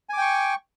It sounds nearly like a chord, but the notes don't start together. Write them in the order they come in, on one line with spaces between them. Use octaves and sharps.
G#5 D6 G5 C#6